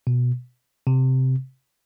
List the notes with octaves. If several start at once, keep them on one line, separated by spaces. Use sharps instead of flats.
B2
C3